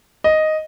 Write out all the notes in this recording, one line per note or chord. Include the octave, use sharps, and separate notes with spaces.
D#5